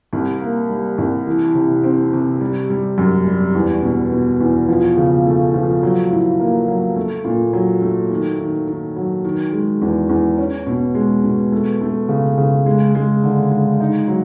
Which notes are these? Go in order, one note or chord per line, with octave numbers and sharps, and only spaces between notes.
C2
A#3
G3
C2
E3
C3
C4
C3
G3
G3
F#2
G3
E2
B2
B2
E2
F3
C#3
A3
F3
F#3
A2
A#3
F#3
A3
A#2
F#3
A3
D#3
D#3
D#3
F#3
D#3
G#3
E2
E2
C#4
B2
G#3
B2
A3
A3
C#3
C#3
G#3
G#3
D3
G#3
D#4
F#3